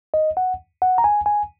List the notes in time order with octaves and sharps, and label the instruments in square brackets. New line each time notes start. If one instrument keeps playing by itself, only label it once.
[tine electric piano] D#5
F#5
F#5
A#5
G#5
G#5